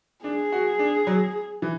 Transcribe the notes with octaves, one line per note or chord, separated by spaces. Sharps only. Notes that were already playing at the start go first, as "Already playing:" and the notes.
D4 G#4
F#4
D4
F#3
E3